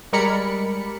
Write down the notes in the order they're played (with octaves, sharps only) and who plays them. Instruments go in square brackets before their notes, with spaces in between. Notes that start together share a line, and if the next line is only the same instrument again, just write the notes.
[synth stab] G3 G#3 A#4 D5 B5 C#7